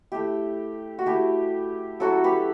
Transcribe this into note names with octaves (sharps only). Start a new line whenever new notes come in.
A3 E4 G4
F#4
A3 E4 G4
F#3 C#4 E4 F#4 A4
G4 B4